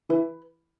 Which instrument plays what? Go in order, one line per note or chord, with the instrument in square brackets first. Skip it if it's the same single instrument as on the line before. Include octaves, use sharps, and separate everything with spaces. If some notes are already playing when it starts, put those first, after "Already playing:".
[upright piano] E3 E4 [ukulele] B4